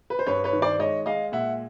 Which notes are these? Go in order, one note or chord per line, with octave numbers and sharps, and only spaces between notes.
B4
C5
G2 B4 C#5
B4 C#5
D#3
C5 D5
G#3 C#5 D#5
G#3 D#5 F5
A#2 E5 F#5